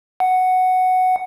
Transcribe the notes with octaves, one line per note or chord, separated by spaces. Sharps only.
F#5